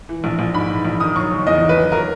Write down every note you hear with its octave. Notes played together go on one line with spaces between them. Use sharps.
E3
A#1
A#1
G#2 B5
E3
A#1
D#3 D#6
F#3 C#6
F#1
E2 D#5
D#3
B4
F#3
F#3 A#4